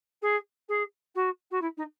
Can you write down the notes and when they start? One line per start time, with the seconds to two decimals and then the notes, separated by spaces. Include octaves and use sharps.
0.22 G#4
0.69 G#4
1.15 F#4
1.51 F#4
1.61 E4
1.77 D#4